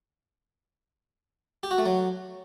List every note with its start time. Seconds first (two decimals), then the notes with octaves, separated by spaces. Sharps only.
1.63 G4
1.71 F#4
1.78 A3
1.86 F#3